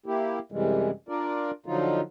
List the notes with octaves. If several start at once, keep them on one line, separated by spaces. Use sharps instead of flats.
A#3 E4 G4
F#2 C3 E3 G3 G#3
D4 F4 A#4 D5
D3 F3 F#3 D#4 F4